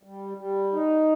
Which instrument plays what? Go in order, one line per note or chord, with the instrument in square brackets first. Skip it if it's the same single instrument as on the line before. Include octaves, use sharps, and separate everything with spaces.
[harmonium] G3
G3
D#4